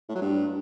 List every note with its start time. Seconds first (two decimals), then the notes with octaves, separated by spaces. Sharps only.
0.09 A2
0.15 F#3
0.22 G2